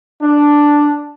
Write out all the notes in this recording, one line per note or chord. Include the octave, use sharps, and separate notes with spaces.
D4